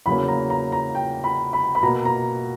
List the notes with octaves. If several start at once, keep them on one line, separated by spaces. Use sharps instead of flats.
E2 C#3 F#3 A#3 B5
A#5
A#5
A#5
G5
B5
B5
B5
B2 A#3 A#5
A#5